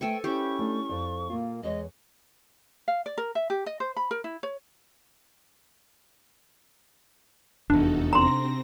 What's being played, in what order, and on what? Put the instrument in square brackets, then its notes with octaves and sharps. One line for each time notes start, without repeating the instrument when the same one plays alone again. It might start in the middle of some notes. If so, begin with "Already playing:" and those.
[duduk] A3 [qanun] A4 G#5 C#6 [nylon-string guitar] B4 C5 [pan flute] G5
[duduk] C#4 [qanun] E4 G4 [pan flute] C#6
[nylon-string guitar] A3 D4 D#4
F2 F3 D5
[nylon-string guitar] A#2 F4 [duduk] A#3
[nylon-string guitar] E2 G#4 C#5 [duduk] G#3 [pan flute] D#5
[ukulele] F5
D5
A#4
E5
G4
D#5
C5
B5
A#4
E4
C#5
[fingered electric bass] F1 E2 [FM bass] D4 [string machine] D#4 F#4 A4
[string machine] C3 C4 A#6 [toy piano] A#5 C6